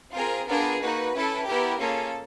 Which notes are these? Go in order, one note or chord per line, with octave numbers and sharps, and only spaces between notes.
C4 F4 G#4 A#4
B3 D4 F4 G#4 A#4
A#3 D#4 F#4 B4
C#4 E4 A4
B3 E4 G4 A#4
A#3 C#4 F4 G#4 A4